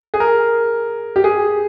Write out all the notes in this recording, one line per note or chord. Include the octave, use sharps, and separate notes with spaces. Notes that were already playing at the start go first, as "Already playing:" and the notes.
G#4
A#4
G4
G#4